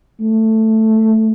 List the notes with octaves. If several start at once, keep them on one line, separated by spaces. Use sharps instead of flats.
A3